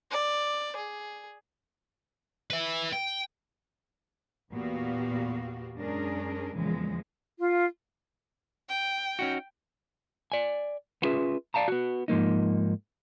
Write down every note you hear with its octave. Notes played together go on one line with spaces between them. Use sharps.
D5
G#4
B4 E5
G5
E2 A#2 B3 F#4 G4 F5
F#2 G#3 C#4 D4 G#4 A#4
E2 A#2 C#3 E3 F3 G#3
F4
G5
C#4 D#4 F#4
D5 G#5
B3 C#4 F4 G#4 B4 E5
D5 F5 A5 A#5
B3 F#4
G#2 F3 A#3 D#4